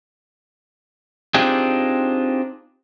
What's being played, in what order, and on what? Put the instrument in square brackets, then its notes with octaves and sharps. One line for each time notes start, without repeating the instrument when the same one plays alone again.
[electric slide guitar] C4 D4 D#4 F4 G4 G#4